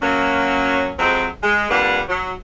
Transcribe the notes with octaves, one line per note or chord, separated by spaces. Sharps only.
F#3 A#3 C#4
F2 F#3 G#3 C4
G#3
F2 G3 A#3 D4 B4 F#5
F#3